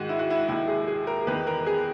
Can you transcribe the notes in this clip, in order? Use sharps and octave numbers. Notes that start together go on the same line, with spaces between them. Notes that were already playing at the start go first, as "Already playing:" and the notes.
Already playing: G#2 D#3 F#4
E4
F#4
E4
D#2 D#3 E4
G#4
G#4
A#4
E2 D#3 B4
A#4
G#4